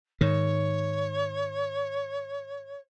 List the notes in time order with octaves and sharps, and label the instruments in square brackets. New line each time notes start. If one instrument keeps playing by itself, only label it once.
[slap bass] G#2 D#3 [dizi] C#5